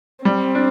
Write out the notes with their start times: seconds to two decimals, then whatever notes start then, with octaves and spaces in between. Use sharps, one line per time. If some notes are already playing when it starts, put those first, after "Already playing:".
0.25 G3 C4
0.55 D4